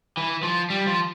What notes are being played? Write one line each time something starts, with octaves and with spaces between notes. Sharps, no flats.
E3
F3
G3
F3